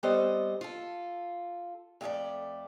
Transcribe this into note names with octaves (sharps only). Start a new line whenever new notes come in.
G3 B3 C4 A4 C5 D#5
F4 A4
F2 A3 E4 G#4 A4 D5